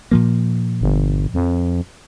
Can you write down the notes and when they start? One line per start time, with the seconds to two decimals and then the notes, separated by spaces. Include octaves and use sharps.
0.11 A#2 F3 A#3
0.81 G1
1.34 F2